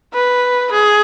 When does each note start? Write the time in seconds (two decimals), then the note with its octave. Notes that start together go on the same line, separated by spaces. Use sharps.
0.14 B4
0.72 G#4